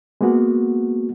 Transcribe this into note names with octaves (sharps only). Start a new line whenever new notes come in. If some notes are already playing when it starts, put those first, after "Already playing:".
G#3 A#3 B3 F#4